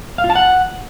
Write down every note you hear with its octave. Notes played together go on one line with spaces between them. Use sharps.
F5
F4
A5
F#5